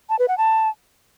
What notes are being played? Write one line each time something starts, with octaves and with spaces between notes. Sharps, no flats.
A5
B4
F#5
A5